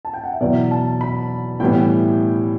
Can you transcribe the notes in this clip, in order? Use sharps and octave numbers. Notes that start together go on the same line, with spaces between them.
A5
G5
F#5
E5
E2 B2 F#3 B3 D5
A5
B5
A2 E3 G3 B3 G5